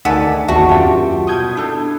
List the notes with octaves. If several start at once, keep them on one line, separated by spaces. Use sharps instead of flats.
D2 D#3 D5 E5 F#5 G#5 A5
G#1 D#2 D4 F#4 E5 A5 C#6
F#2 F4 G4 E5
B2 G3 D#6 G6 G#6
D4 E4 A4